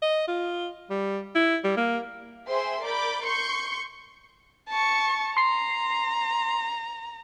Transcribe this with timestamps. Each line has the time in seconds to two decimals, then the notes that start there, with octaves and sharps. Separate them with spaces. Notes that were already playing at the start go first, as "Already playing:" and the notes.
0.02 D#5
0.28 F4
0.90 G3
1.35 E4
1.64 G3
1.77 A#3
2.47 G#4 C5 E5 G5 C6
2.82 A#4 D5 B5 D6 G6
3.22 C6 C#6 G6 C#7
4.69 A5 C#6
5.37 A#5 C6 C7